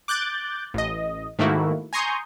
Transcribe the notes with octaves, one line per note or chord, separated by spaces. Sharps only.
D6 F#6 G6 A6
A1 D#5
G#2 D#3 A3 A#3 E4 F#4
G#5 A#5 C6 C#6 D#6 G6